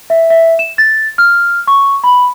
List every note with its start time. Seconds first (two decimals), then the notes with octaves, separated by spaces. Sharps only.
0.10 E5
0.30 E5
0.59 E7
0.78 A6
1.18 F6
1.67 C#6
2.04 B5